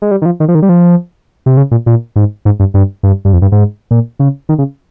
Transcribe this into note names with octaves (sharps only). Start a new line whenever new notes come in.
G#3
G3
D#3
F3
D#3
F3
D#3
G3
F3
C3
C#3
A#2
A#2
G#2
G#2
G2
G2
G2
G2
F2
G2
G#2
A#2
C#3
D#3
C#3